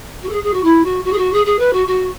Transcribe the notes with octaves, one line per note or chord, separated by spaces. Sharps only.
F#4
A4
G#4
G#4
F#4
E4
F#4
F#4
G#4
F#4
G#4
G#4
B4
F#4
F#4